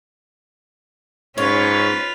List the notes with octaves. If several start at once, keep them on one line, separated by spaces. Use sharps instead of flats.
G#2 C#4 F4 B4 C#5